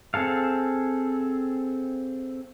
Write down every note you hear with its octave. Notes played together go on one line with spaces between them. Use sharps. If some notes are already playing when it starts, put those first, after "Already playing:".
C4 G#4 A4 F5